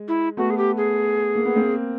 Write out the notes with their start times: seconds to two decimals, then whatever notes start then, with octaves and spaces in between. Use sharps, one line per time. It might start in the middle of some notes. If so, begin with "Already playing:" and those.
Already playing: G#3
0.08 E4
0.37 A3 B3 F#4
0.50 G#4
0.58 G4
0.77 G#4
1.36 A#3
1.45 B3
1.56 A#3 C4